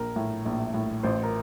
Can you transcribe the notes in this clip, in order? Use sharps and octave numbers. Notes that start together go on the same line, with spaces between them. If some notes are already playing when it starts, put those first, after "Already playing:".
Already playing: A#1 A#4
A2
A#1
A2
A1 C5
A#4